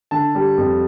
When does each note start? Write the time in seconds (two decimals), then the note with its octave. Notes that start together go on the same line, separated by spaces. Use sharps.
0.11 D3 A5
0.35 G3
0.58 F2